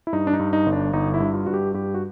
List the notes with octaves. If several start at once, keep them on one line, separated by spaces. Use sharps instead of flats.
E4
G2 D#4
D4
D#4
G2
D#4
G1
D4
G1 D#4
E4
G2
F4
G2 F#4
G4
G2 G4
F#4